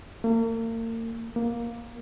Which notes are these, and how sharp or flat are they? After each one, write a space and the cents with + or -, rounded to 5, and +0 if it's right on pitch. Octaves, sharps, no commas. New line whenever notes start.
A#3 -40
A#3 +10